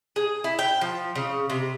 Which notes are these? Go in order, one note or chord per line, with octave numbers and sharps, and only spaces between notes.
G#4
E4
G5
F3
C#3
C3